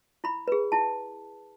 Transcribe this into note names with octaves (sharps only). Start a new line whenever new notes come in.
E4 B5
G#4 B4
E4 A5